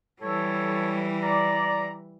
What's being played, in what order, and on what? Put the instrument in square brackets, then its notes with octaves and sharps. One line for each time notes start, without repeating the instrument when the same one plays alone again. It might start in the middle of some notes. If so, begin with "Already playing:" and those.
[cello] E3 G3 [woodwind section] A4 C#5
[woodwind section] D5 A#5